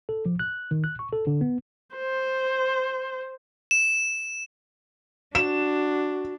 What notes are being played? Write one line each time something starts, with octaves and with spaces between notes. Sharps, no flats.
A4
F3
F#6
D#3
F#6
C#6
A4
D3
B3
C5
E7
D4 F#4 E7